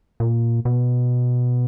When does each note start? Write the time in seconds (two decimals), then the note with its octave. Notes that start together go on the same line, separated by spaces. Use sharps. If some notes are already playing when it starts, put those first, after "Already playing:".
0.20 A#2
0.65 B2